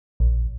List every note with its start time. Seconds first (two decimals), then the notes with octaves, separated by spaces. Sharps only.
0.20 A#1